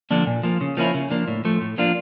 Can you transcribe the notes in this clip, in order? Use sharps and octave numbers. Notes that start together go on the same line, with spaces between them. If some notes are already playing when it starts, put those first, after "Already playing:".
D3 F3 A#3 D4
A#2
F3 A#3
C#3
F3 A#3 C#4 E4
C#3
F3 A#3 D4
A2
F3 A3
A2
F3 A#3 D4 F4